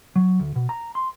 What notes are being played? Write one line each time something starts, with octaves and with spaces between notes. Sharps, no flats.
F#3
D2
B2
A#5
C6